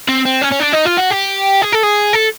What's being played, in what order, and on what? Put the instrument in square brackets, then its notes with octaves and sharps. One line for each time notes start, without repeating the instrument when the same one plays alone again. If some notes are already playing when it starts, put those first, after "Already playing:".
[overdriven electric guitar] C4
C4
C#4
C#4
D4
D#4
F4
F#4
G4
G#4
A4
G#4
A4